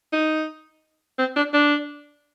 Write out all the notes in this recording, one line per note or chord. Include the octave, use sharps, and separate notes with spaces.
D#4
C4
D4
D4